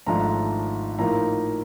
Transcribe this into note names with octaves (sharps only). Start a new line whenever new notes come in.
G#1 G#2 F3 A3 D4 A#5
A2 F3 A#3 D#4 A#5